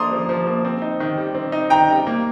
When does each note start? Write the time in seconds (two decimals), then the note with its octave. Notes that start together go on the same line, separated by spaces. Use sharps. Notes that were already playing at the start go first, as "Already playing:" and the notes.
Already playing: F3 A#3 D4 A#5 C6 D#6
0.11 F3
0.29 F3
0.47 A#3
0.65 C4
0.82 D#4
1.00 D#3
1.18 G3
1.35 C4
1.52 D#4
1.70 D#3 G5 A#5
1.89 G3
2.07 A#3